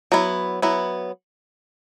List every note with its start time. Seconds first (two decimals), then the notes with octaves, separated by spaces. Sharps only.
0.12 F#3 B3 E4
0.62 F#3 B3 E4